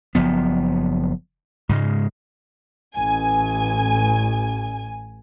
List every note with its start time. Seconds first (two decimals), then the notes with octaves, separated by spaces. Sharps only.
0.15 F#1 F3 B3
1.69 G#2 C#3 G#3
2.95 A1 G#5